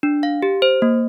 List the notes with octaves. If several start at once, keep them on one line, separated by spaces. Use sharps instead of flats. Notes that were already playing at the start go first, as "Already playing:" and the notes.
D4
F5
G4
C5
A#3